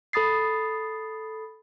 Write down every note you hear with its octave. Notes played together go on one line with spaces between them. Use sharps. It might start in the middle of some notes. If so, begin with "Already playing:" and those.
A4 B5 D#6 A6 C7